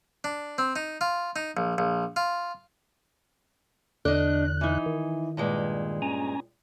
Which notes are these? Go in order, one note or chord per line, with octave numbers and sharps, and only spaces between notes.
D4
C4
D#4
F4
D#4
A#1
A#1
F4
E2 D3 D4 D#5 F#6
E3 D#4
D#3
G2 A#2 G#3
C#4 G#5 A#5